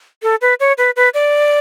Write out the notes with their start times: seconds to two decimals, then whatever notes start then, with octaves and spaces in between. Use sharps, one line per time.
0.23 A4
0.41 B4
0.60 C#5
0.78 B4
0.96 B4
1.14 D5